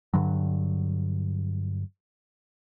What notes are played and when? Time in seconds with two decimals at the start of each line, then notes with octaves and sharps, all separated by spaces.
0.14 G2 D3 F#3